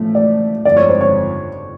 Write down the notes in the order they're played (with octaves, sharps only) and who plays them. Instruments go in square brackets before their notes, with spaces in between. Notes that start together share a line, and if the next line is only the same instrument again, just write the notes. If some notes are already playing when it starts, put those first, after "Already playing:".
Already playing: [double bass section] A1 A2 F3 A3
[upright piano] D5
[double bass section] G1 F2 D3 [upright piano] D5
[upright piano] C#5
C5
C#5